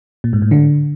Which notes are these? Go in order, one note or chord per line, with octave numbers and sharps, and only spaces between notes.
A#2
G#2
A2
D3